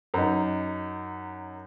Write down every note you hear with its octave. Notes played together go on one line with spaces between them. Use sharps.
F#2 D#4